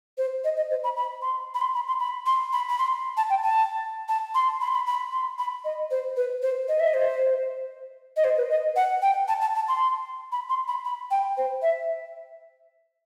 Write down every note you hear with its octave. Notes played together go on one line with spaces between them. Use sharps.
C5
D#5
D#5
C5
B5
B5
C6
B5
C6
B5
C6
B5
C6
B5
B5
C6
A5
G5
A5
A5
C6
B5
C6
B5
B5
C6
B5
D#5
C5
B4
C5
D#5
E5
D#5
C5
D#5
C5
B4
D#5
F#5
G5
A5
A5
A5
C6
B5
C6
B5
B5
G5
C5
E5